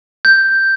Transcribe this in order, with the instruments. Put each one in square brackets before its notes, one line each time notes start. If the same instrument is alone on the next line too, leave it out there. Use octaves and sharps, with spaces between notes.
[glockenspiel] G6